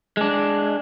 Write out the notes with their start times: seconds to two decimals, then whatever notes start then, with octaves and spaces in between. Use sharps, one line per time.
0.17 G#3 D4